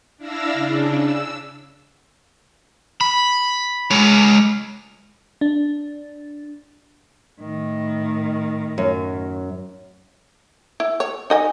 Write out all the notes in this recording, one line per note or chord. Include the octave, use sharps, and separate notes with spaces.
D4 E4 F5 E6 A#6
C#3 D4
E6
B5
G#3 C#5
D4
A2 D#3
F#2
E4
C#5
D#4 D#5 G#5